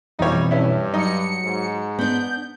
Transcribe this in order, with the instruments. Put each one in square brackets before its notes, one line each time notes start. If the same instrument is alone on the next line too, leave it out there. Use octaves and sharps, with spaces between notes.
[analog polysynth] F2 B2 E3 [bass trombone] G3 [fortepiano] D#4 C#5
[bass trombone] G2 [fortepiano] C#4 E4
[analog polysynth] F#3 C#7 [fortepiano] D#4
[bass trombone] G#2
[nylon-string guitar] B3 D4 [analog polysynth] G6